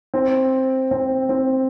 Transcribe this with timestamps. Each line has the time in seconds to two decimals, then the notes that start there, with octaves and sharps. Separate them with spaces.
0.14 C4
0.91 C4
1.29 C4